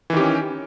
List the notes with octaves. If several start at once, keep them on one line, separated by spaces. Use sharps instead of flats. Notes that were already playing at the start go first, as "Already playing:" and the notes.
D#3 E3 C#4 G4